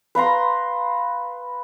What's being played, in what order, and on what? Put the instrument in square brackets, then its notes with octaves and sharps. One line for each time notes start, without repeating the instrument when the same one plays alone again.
[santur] B4 F5 A#5 C6